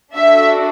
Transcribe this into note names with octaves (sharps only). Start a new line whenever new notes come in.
D4 F#4 A4 E5